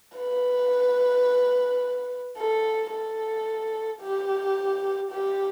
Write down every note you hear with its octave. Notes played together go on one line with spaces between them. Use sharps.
B4
A4
A4
G4
G4